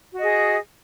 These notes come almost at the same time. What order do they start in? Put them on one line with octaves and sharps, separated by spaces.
F#4 D#5 G#4